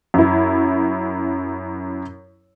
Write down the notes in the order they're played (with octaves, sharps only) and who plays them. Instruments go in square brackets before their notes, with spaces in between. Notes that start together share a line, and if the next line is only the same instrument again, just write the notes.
[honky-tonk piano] F#2 E4